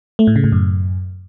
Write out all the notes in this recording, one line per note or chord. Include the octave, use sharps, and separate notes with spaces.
A3
A2
C#3
A2
F#2